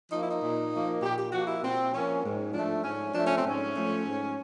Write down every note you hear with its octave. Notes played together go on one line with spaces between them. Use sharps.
F3 A#3 D#4
E4
D#4
A#2
F3 A#3
A#2 G4
G4
F3 A#3 F#4
E4
A#2 C4
F3 A#3 C#4
G#2
F3 A3 D4
G#2 C#4
F3 A3 D4
C#4
C4
G#2 C#4
F3 A3
G#2